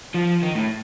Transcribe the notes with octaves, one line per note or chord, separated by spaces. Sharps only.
F3
D#3
A2